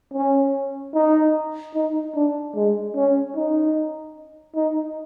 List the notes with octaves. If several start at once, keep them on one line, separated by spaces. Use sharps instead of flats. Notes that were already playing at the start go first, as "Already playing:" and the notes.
C#4
D#4
D#4
D4
G#3
C#4
D#4
D#4